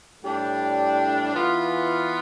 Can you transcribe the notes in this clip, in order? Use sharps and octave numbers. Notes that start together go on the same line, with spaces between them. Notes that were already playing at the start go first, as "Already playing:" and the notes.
A2 G3 D4 G4
E3 B3 F4